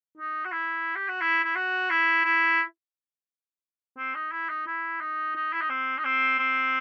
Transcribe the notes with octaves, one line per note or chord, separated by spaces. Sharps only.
D#4
F#4
E4
G4
F#4
E4
E4
F#4
E4
E4
C4
D#4
E4
D#4
E4
D#4
D#4
E4
D#4
C4
D#4
C4
C4